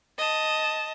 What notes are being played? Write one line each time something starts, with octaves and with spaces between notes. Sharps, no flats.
D#5 A5